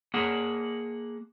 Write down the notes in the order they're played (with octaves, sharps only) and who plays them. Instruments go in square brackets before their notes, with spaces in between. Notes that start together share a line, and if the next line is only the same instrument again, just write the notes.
[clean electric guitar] A#3 G#4 F#5